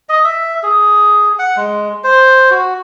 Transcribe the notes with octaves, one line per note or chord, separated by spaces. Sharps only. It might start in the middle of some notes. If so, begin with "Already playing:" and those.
D#5
E5
G#4
F#5
G#3
C5
F#4